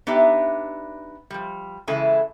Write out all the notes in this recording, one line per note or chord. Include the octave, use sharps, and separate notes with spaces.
B3 D4 D#4 G4 E5
F3 G3
C#3 E3 G#3 E4 A4 G#5